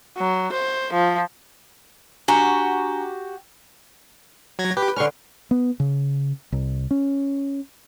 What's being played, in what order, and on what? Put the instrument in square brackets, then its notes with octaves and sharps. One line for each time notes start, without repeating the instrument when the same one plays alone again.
[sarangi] F#3
C5
F3
[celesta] D4 G#5 A#5 [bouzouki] F#4 G4
[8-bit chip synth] F#3 G#6 A#6
[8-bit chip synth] G4 [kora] B4
[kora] D3 C#4 [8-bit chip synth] C6 C#6 F6
[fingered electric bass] B3
C#3
C2
C#4